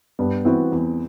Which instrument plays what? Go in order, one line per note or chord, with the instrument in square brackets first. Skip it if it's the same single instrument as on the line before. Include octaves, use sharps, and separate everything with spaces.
[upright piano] G2 [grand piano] G3 B3
[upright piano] E3 B3 F#4 [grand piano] C4 E4
[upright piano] E2